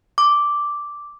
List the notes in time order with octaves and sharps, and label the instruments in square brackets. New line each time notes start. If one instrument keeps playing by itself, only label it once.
[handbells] D6